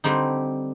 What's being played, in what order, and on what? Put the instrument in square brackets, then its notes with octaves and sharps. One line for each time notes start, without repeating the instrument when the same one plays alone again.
[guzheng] D3 G3 C4 D#4